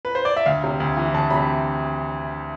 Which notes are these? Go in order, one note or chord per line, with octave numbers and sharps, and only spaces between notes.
B4
C5
D5
E5
D2 F5
C3
D2
E3
D2 A5
C3 B5